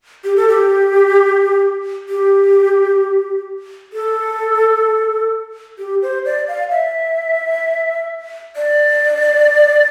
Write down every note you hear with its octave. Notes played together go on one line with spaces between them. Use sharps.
G4
A4
G4
G4
A4
G4
C5
D5
F5
E5
D5